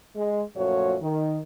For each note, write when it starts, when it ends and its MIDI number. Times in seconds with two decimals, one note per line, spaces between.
0.15 0.41 56
0.55 0.95 42
0.55 0.95 46
0.55 0.95 53
0.55 0.95 57
0.55 0.95 66
0.55 0.95 73
1.00 1.40 51